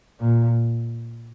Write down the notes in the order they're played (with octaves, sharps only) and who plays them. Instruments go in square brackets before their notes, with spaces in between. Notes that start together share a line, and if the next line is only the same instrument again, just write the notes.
[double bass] A#2